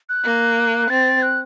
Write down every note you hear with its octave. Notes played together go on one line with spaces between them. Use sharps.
F#6
A#3
C4 A6
F#6